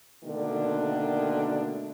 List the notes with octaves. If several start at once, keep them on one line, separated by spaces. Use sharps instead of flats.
B2 D3 D#3 A3 A#3 D4